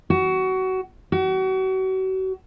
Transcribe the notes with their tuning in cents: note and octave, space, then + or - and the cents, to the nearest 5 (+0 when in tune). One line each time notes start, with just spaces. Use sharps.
F#4 +20
F#4 +35